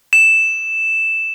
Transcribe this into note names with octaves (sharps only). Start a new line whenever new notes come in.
E7